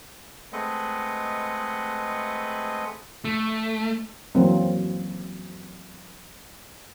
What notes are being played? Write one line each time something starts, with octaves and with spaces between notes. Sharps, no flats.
G#3 A3 C4 B4 D#5 F#5
A3
E3 F#3 A#3 C4